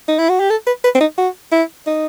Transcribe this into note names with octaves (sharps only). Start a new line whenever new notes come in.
D#4
E4
F#4
G4
A4
B4
B4
C4
D#4
F#4
E4
D#4